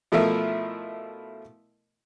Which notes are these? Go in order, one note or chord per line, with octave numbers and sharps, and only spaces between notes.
B2 F3 A3 E4 A#4